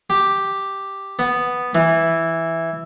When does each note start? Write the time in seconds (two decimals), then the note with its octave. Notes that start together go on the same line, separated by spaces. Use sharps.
0.10 G4
1.19 B3
1.75 E3